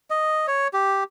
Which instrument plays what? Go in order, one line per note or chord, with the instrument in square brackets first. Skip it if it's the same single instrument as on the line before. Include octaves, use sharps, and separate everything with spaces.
[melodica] D#5
C#5
G4